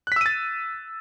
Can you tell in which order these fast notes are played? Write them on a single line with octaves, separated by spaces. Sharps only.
F#6 B6 E6 D#7 A6